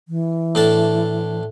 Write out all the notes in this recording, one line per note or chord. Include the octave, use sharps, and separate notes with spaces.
E3
A2 D4 A5